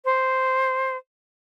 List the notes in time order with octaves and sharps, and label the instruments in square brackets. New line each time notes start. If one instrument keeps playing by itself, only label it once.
[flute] C5